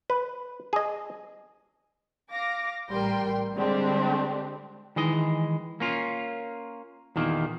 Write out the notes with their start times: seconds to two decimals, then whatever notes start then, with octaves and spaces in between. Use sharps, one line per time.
0.10 B4
0.73 G#4 D#5
2.31 F5 D6 A#6
2.90 A1 G3 A#4 G5 C6
3.56 D3 G3 G#3 C4 D4 G4
4.96 D#3 E3 G#3 D#5
5.80 A#3 C#4 F4
7.16 E2 A#2 D#3 A#3